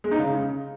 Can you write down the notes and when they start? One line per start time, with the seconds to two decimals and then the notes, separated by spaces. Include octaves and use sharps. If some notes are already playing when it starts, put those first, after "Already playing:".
0.04 G#3
0.11 D#4
0.19 C#3